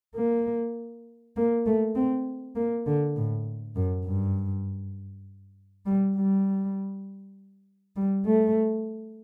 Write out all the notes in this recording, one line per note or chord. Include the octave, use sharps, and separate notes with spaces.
A#3
A#3
A3
C4
A#3
D3
A2
F#2
G2
G3
G3
G3
A3